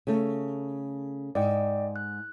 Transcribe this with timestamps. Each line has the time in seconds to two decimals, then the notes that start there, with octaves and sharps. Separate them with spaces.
0.07 C#3 A3
1.35 G#2 D5 D#5 G5
1.96 F#6